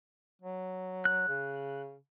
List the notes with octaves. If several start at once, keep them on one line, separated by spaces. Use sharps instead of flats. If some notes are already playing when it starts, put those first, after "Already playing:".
F#3
F#6
C#3